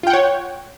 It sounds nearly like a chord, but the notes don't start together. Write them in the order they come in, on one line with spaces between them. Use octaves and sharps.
F4 G5 F#5 C#5